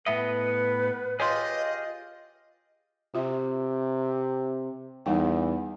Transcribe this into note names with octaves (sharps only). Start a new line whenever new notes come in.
A2 B3 B4 D#5 E5
F4 G4 G#4 C#5 D#5 C6
C3 F4 E5
E2 G3 D#4 G5